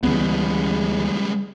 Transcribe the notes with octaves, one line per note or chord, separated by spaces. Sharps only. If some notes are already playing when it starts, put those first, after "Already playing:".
D2 C#3 E3 G3 G#3 B3